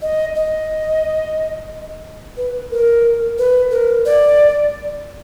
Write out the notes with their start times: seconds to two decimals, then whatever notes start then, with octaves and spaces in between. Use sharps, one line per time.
0.02 D#5
0.36 D#5
2.37 B4
2.71 A#4
3.38 B4
3.71 A#4
4.06 D5